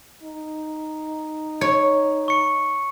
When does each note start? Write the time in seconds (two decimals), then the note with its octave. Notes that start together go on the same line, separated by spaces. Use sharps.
0.23 D#4
1.61 C#5
2.28 C#6 C#7